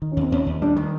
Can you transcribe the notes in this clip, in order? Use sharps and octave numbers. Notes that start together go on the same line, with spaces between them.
D#3
C#4
D#2
C4
D#2 C#4
D#2
G3 D4
D#3